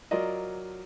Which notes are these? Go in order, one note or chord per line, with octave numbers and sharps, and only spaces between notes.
F#3 F4 A#4 D5 D#5